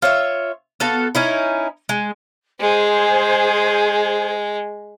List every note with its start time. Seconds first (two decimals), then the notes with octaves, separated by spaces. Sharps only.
0.02 F4 C#5 E5
0.80 B3 F#4 A4 F5
1.15 C#4 D#4 E4
1.89 G#3
2.60 G#3 G#4 C5